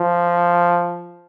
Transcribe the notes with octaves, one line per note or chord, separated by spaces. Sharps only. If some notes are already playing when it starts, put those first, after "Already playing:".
Already playing: F3